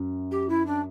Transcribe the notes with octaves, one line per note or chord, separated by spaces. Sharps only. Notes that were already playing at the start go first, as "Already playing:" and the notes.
Already playing: F#2
G4
E4
D4